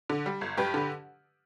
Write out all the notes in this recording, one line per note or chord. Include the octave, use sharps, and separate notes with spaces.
D3
G3
G1
G2 G4 B4
D3